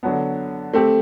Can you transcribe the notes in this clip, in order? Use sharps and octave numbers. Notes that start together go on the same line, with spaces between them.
D3 F#3 B3
A3 C4 G4